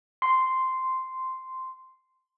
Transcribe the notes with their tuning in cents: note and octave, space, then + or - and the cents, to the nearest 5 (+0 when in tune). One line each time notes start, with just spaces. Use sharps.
C6 -5